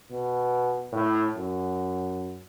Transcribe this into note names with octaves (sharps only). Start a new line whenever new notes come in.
B2
A2
F#2